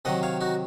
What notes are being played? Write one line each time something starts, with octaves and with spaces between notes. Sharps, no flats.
C3 D#3 F#3 D#5 F#5
C#5 F5
D#4 F#4